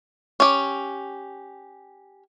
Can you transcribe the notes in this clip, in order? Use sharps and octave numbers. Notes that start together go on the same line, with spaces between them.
C#4 G4